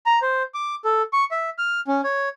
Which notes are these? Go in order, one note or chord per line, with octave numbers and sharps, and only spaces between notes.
A#5
C5
D6
A4
C#6
E5
F6
C#4
C#5